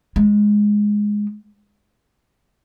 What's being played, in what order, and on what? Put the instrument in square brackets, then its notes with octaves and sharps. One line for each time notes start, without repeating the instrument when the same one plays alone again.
[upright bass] G#3